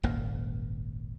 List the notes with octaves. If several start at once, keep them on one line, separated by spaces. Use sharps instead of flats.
D#1 G#1 F#2 A#3